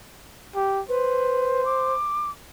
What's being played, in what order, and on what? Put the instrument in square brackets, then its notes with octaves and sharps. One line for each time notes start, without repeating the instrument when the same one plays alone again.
[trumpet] G4
[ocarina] B4 [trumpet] C5
[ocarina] D6